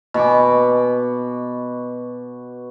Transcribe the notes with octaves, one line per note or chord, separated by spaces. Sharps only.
B2 B5 C#6 D6